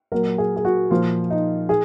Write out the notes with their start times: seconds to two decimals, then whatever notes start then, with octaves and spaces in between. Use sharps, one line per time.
0.12 A#2 F#3 A#4
0.38 G#4
0.56 G#4
0.65 F#4
0.91 A#2 F3 F4
1.30 D#4
1.69 G#4